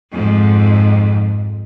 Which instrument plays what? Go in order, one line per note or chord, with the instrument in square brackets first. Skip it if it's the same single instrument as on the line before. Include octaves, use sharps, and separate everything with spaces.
[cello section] F2 G#2